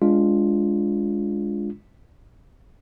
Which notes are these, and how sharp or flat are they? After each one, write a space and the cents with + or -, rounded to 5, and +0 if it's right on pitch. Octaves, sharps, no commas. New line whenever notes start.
G#3 +0 D4 -25 F4 +0